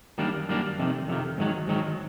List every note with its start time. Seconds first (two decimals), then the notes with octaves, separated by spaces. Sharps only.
0.18 F#2 D#3 G3 A#3 D4
0.49 F#2 D#3 G3 A#3 D4
0.79 F2 C3 D#3
1.08 F2 C3 D#3
1.38 G#2 D#3 F#3
1.67 G#2 D#3 F#3